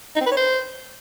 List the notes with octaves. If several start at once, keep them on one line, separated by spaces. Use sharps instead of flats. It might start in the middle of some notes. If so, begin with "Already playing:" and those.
D#4
C4
B4
C#5
C5